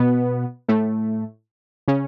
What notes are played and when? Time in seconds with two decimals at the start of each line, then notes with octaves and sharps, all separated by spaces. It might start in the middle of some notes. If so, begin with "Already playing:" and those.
Already playing: B2 B3
0.68 A2 A3
1.88 C#3 C#4